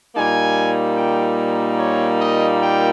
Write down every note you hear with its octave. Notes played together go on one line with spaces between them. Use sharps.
A#2 G3 A#3 D#4 G#5
G5
C#5
D#5
G5